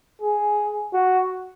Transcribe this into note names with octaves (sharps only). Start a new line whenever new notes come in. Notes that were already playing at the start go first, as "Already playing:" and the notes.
G#4
F#4